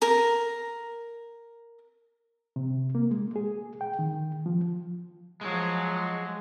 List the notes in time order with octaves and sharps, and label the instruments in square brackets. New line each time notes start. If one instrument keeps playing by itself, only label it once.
[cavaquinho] A#4 A#5
[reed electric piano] C3
A#3
G#3
G#4
G5
D#3
F3
[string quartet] F3 F#3 [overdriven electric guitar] G#3